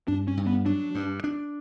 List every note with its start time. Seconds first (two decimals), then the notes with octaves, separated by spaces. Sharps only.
0.08 G2 D4
0.27 C#4
0.37 G2
0.47 B3
0.66 F#3 D4
0.95 G2
1.24 D4